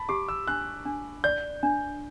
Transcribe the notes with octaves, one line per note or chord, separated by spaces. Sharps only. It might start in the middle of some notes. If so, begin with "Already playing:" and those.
Already playing: A5 B5
G4 D6
E6
D4 F#6
D4
D5 G6
D4